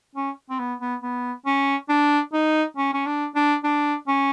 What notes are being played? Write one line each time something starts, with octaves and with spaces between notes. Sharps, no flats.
C#4
C4
B3
B3
B3
C#4
D4
D#4
C#4
C#4
D4
D4
D4
C#4